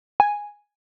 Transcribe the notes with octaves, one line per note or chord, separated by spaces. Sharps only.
G#5